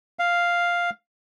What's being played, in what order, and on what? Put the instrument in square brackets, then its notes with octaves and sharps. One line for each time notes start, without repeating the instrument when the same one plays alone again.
[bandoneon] F5